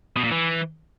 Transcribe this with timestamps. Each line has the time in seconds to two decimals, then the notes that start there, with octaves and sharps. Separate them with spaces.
0.17 B2
0.24 A#2
0.32 E3